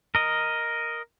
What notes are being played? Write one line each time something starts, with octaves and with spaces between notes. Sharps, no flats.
A#4 D#5